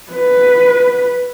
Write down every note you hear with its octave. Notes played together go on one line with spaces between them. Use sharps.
B4